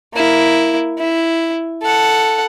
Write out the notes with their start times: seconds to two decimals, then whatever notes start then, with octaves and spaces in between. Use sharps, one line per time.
0.15 A#3 E4
0.98 E4
1.83 A4 F#5